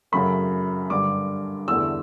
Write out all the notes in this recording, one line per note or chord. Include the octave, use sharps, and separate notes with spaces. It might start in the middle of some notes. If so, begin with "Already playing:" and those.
F#2 C#3 F#3 A3 B5
G2 D3 G3 D6
E2 D3 A3 E6